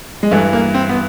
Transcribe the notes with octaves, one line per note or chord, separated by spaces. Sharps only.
G#3
G2 E3 A3
A#3
C4
B3